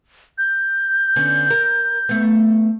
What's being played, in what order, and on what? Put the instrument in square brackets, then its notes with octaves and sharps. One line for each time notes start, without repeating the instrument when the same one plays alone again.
[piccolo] G6
[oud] D3 B3 C#4
A#4
A3 B3